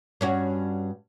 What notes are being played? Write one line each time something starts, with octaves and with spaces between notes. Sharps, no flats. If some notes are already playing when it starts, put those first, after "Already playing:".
G2 C#4 F#4